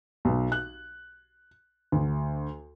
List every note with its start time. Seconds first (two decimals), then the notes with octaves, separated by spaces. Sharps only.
0.25 B1
0.52 F#6
1.92 D2